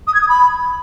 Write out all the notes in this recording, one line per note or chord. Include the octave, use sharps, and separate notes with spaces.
D#6
G#6
D#6
B5